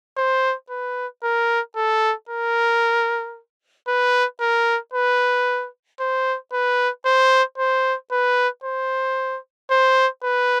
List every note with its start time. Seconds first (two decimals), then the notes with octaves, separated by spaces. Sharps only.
0.17 C5
0.70 B4
1.23 A#4
1.76 A4
2.29 A#4
3.88 B4
4.41 A#4
4.94 B4
6.00 C5
6.53 B4
7.06 C5
7.58 C5
8.12 B4
8.64 C5
9.71 C5
10.23 B4